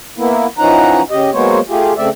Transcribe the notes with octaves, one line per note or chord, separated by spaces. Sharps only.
A#3 B3 E4
E3 F3 C#4 D#4 F#5 A#5
C#3 G4 D#5
F#3 G#3 A#3 B3 C5 C#5
A3 F4 G4 G#4
C#3 A3 C4 D5 E5